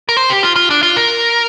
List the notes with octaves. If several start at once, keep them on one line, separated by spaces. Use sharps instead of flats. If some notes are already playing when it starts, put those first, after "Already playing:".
A#4
C5
G4
F4
F4
D4
F4
A#4